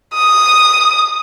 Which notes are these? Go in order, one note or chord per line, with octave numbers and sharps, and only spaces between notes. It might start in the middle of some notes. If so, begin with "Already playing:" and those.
D#6